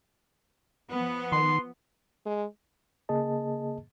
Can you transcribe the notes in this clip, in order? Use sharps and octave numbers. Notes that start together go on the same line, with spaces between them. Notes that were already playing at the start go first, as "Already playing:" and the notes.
F3 B3
D#3 C6
G#3
C#3 A#3 G#4 D#5 A5